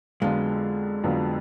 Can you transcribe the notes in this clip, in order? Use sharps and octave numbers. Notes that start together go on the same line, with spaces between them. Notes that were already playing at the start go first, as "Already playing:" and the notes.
F2 D3 F#3 G#3 B3 F4
F2 D3 F#3 B3 F4